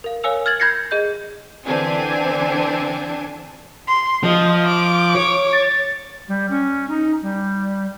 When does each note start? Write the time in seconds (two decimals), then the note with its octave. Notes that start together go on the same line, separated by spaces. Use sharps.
0.04 A#4 F5
0.23 A#4 C#5 F5 G#5 E6 F7
0.46 F6 G#6 A6 F#7
0.60 B5 G6 G#6 A#6 C7 C#7
0.91 G#4 D#5 G6
1.65 D3 E3 C4 D4 G#5
3.88 C6
4.23 F3 D#5
4.68 D6
5.15 C#5
5.53 A6
6.28 G3
6.50 C#4
6.89 D#4
7.22 G3